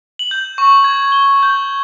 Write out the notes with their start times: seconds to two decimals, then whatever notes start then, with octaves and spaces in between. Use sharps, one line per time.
0.19 F#7
0.31 G6
0.58 C#6
0.84 G#6
1.12 G7
1.43 G6